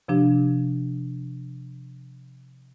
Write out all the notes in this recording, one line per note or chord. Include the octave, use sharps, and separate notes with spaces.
C3 F3 D4 G4